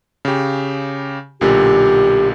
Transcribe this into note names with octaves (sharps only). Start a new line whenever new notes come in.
C#3 G4
B1 A#2 D3 G4